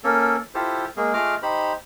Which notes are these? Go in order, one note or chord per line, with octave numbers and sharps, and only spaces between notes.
A#3 C#4 A4
E4 F4 G4 A4 C5
G#3 A#3 G#4
A3 F4 G#4 D#5 D6 F6
D#4 G4 C5 B5